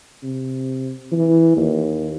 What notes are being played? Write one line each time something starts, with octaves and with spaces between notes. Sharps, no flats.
C3
E3
D#2